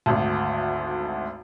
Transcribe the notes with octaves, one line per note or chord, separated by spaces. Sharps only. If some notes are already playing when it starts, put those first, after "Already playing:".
G#1 D2